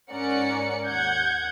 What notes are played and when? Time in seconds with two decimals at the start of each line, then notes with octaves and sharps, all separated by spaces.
0.11 G#2 C#4 A#4 D5 F#5 C#7
0.87 D#2 F#5 G6 G#6